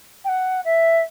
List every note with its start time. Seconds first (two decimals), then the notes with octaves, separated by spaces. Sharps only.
0.24 G5
0.28 F#5
0.64 E5